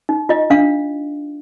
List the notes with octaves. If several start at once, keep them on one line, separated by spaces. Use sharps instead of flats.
D#4
F4 D#5
D4 F5